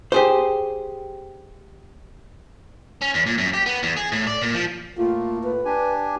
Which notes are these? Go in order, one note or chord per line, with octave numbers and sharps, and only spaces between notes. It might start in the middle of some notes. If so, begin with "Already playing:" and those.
G4 G#4 C5
C#4
E2
A#2
F#2
G4
B3
E2
G#4
A2
D5
A#2
F3
A2 A3 A#3 F4
B4
D4 G4 G#5